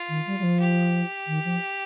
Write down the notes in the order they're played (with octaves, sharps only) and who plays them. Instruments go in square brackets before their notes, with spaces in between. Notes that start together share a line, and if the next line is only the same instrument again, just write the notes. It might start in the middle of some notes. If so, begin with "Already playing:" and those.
Already playing: [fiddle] F4
[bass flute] D#3
G3
G3
F3
[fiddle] G4
[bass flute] D#3
F3